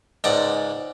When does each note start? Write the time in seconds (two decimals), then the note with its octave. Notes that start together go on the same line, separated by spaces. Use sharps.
0.24 C#2 G#2 D5 F#5